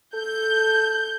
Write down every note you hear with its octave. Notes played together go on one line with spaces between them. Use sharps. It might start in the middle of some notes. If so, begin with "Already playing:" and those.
A4 G6